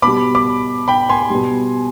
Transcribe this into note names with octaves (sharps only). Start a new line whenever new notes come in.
B2 G3 B5 D6
B5 D6
G5 B5
G#5 C6
B2 G3